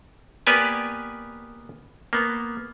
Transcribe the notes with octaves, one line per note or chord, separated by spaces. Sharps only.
A#3 B3 G4 B4 D5 G#5
A#3 B3